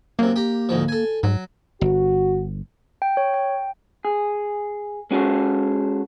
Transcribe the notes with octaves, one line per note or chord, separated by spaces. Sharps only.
F#2 C3 A#3
G4 A#5
D2 G#2 F3
A4 G#5
G#2 F#3
G1 F#4
G5
C#5
G5
G#4
G#3 C#4 F#4 G#4 A4